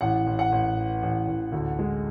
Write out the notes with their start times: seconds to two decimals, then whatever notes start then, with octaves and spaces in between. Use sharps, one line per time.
0.01 A1 F#5
0.27 A1
0.39 F#5
0.52 A1
0.76 E3
1.02 A1
1.28 A1
1.52 D2
1.79 G#3